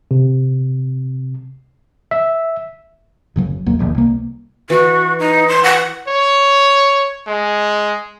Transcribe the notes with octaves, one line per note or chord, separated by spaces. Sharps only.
C3
E5
F#1 C#3 F#3
A#1 E2 F#3 A#3
E1 A#1 D#2
C2 A#3
E3 F#4
D#4
C6
F#5
C#5
G#3